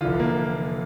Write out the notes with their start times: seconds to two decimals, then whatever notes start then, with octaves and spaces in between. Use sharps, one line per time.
0.01 F1 E2 D3 F4
0.20 A#3